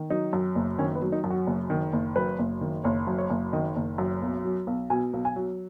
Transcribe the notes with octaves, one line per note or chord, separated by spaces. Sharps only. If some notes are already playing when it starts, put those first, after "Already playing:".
Already playing: D#3
F#3 D#4
F#2
F#1
D#3 C#4
B3
F#3
D#4
F#2
F#4
F#1
D#3
F#1
F#2 B4
F#1
D#3
F#1 C#5
F#2
C#5
F#1
D#3 D#5
F#1
F#2
B1
F#3
B1
B2 G#5
B1
G#5
F#3